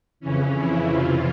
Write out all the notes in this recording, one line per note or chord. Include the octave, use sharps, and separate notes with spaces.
F2 C#3 E3 C#4
E4
F2 C3 E3 F4